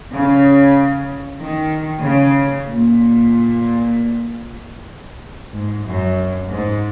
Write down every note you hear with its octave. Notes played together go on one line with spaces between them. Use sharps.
C#3
D#3
C#3
A#2
G#2
F#2
G#2